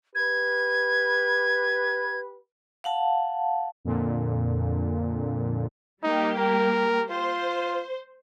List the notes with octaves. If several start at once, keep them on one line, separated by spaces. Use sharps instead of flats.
G4 B4 G#6
F5 F#5 A5
F2 A#2 D3
G3 A#3 D#4 G4
A#4
F4 C5